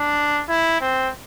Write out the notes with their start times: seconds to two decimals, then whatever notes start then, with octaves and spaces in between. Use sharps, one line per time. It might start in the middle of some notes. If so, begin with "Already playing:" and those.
Already playing: D4
0.49 E4
0.81 C4